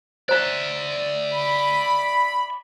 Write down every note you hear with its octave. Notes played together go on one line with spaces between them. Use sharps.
C5 D5 E5 A#5
B5